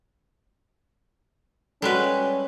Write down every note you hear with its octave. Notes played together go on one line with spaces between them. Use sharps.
G3 G#3 C#4 F#4 A4 B4